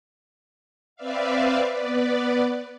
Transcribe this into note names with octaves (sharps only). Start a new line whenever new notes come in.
C4 B4 D5 E5 F5
B3 B4 D5